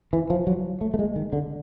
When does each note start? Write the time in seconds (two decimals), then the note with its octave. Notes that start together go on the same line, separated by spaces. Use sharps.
0.13 E3
0.30 F3
0.47 F#3
0.81 A3
0.94 A3
0.99 G#3
1.16 D#3
1.33 D3